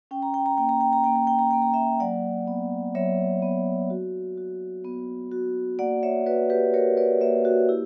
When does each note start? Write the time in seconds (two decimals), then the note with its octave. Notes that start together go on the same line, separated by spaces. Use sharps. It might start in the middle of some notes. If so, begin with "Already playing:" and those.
0.11 C#4 G5
0.22 A#5
0.34 G5
0.46 A#5
0.58 A#3 G5
0.69 A#5
0.81 G5
0.93 A#5
1.04 A#3 G5
1.16 A#5
1.27 G5
1.39 A#5
1.51 A#3 G5
1.62 A#5
1.73 E5 G5
2.00 F#3 D5 F#5
2.48 B3
2.95 F#3 C#5 E5
3.42 B3
3.90 F#4
4.37 F#4
4.84 B3
5.32 F#4
5.79 A#3 D5 F#5
6.03 C#5 E5
6.26 F#4 B4 D5
6.50 G4 B4
6.74 F#4 A#4 C#5
6.97 B4 D5
7.21 A#3 C#5 E5
7.45 F#4
7.69 E4 G4